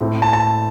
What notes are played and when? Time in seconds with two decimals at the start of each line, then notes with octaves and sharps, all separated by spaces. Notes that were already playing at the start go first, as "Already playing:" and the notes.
0.01 A2 A3 C4
0.22 A5
0.33 A5